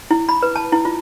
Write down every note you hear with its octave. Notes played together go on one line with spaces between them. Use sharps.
E4
B5
B4
A5
E4
F4